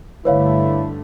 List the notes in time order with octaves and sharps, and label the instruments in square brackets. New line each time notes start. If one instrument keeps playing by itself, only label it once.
[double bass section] G2 D3 A3 [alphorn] E4 [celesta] B4 C#5 F5